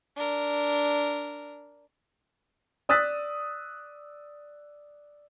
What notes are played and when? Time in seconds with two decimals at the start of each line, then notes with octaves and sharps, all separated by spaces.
0.16 D4 A#4
2.89 D5 D#6 E6 F#6 A6 B6